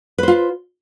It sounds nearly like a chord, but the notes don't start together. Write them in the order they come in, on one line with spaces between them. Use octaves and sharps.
B4 C5 F4